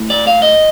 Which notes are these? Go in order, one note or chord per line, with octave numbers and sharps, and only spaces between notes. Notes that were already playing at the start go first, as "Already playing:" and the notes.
Already playing: A2
D5
F5
D#5